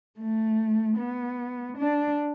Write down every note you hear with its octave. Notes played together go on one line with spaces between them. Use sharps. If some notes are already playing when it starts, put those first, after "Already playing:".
A3
B3
D4